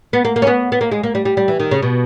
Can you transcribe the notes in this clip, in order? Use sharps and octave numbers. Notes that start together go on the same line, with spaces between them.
B3
A#3
A#3
C#4
B3
B3
A#3
G#3
A#3
G3
G3
G3
E3
D#3
C#3
B2